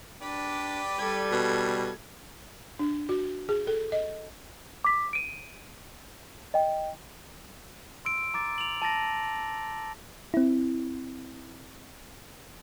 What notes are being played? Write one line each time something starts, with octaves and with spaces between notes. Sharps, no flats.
D4 G4 B4 D5
G3 A4 G#6
B2
D4
F#4
G#4
A4
D#5
D6 B6
D7 D#7
D#5 G5
C6 E6 D7
A#5 D6 A6
F7 F#7
A5 A6 A#6 D7
C4 E4